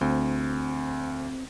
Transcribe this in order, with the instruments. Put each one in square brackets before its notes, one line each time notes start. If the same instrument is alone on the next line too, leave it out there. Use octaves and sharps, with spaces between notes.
[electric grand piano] D2 [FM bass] C4